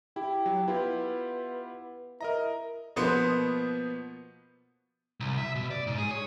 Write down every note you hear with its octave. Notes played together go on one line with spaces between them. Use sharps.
E4 G4
F#3
B3 E4 F4 G4
E4 A#4 D#5 A#5
B2 F3 A#3 B3 C5 C6
C2
E5
B2
D5
G#2
G#4
C#5